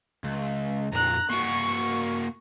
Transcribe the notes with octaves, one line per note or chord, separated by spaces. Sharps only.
C#2
F2 A#2 A#5 F#6
A#3 F#4 C#6